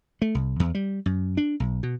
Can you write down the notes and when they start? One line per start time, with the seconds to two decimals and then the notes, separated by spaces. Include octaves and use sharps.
0.22 A3
0.35 C2
0.60 E2
0.75 G3
1.06 F#2
1.37 D4
1.60 B1
1.83 B2